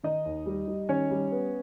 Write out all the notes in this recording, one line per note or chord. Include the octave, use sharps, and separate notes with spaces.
D#3 D#4 D#5
D#2
G3
G3
D#3 C#4 C#5
G3
B3